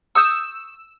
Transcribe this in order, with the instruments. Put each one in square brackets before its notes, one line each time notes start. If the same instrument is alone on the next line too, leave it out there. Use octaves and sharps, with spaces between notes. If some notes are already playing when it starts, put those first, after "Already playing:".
[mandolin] C#6 D#6 G6 [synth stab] E6